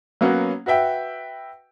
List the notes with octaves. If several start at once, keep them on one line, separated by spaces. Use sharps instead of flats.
F#3 A#3 B3 C#4 F#4
F#4 B4 E5 G5